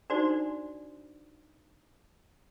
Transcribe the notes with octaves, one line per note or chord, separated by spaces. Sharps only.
D4 D#4 F#4 C5 D5